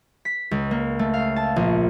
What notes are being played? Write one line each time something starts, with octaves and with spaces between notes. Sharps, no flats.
B6
C#2
A#3
A3
F5
A5
A#1